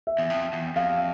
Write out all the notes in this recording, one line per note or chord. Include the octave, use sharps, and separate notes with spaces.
E5
E2
F2
E2
F2 F5